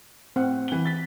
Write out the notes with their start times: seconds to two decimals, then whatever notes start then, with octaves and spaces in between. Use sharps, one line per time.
0.36 A2 C4 F#5
0.68 E3 G7
0.86 A6 B6